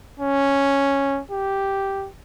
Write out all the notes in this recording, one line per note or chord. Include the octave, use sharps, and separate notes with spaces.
C#4
G4